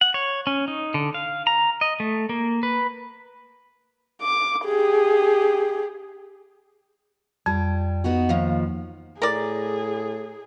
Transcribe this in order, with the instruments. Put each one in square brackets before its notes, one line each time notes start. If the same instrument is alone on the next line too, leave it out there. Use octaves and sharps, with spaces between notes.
[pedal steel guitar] F#5
C#5
C#4
D#4
D3
F5
A#5
D#5
A3
A#3
B4
[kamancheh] D6
G4 G#4
[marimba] F2 [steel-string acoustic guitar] G3
[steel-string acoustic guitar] B3 D#4 F#4
[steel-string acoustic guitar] D#2 F3 [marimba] F5
[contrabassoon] A2 [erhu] G#4 [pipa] A#4 D5